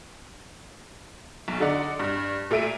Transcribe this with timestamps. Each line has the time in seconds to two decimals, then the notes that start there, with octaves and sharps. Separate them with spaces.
1.48 B1
1.60 D3 D#4 D5 F#5
1.99 G2
2.51 A#2 A3 E5 D7 D#7